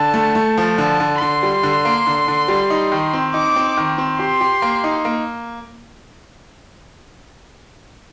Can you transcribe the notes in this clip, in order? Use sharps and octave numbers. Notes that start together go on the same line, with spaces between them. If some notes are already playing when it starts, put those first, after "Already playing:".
Already playing: D3 A5
A3
A3
F3
D3 A5
D3
D3 C6
G3
D3
A#3
D3
D3
G3
D#4
D#3
C4
D#4 D6
C4
D#3
C4
G4 C6
G4
A#3
D#4
A#3